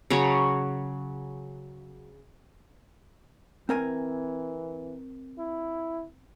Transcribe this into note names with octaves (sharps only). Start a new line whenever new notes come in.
C#3 F#3 C#5 A#5
E3 C4 A#4 G#5
E4